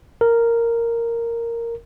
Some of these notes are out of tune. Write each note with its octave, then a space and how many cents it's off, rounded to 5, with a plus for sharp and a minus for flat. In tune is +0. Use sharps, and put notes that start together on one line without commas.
A#4 -5